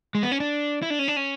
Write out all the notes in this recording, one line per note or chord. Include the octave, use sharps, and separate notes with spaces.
G#3
B3
C#4
D4
E4
D4
C#4
D4
C#4